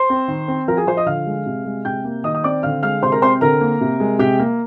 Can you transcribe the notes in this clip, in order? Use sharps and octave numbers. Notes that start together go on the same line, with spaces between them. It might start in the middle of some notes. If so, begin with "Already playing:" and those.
Already playing: C5 C6
C4
D#3
C4
F3 A#4 A#5
G#4 G#5
F3 C5 C6
D#5 D#6
D3 F5 F6
G#3
C3
G#3
C3 G5 G6
A#3
D#3 D#5 D#6
D#6
C4 D5 D6
D3 F5 F6
G#3 F5 F6
C3 C5 C6
A#4 A#5
C4 C5 C6
D3 A#4 A#5
A#3
C3
G#3
C3 G4 G5
A#3